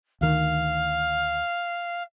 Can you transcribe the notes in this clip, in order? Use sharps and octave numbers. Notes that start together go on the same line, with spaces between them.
D2 D#3 F5